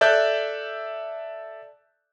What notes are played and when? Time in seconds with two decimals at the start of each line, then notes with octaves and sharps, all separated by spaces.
0.01 A4 D5 E5 F#6 G6